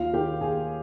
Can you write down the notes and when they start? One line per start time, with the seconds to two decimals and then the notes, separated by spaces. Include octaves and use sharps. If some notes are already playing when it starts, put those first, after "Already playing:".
Already playing: D#2 F4 F5
0.13 D#3 G4 G5
0.41 D#2 G#4 G#5